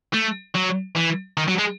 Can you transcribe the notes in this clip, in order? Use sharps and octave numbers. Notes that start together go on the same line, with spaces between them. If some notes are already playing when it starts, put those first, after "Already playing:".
A3
F#3
E3
D#3
F#3
G#3